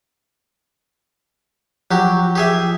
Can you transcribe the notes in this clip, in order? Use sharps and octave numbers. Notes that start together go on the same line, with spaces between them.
F3 F#3 G4
G4 G#4 E5